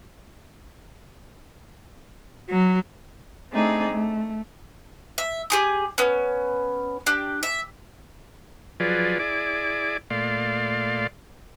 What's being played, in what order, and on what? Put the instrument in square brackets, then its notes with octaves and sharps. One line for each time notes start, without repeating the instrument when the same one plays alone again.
[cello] F#3
[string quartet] A3 C4 D4 D#4 G#4
A3
[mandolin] E5
G4 G#4 D#6
B3 C#4
D4 G4
E5
[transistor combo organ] F3 F#3 F4 G#4 B4 D5
E4 G#4 D5 D6
A#2 A3 D5 F5 C6